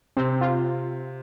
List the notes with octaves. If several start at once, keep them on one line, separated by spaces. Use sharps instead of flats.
C3 C4
F4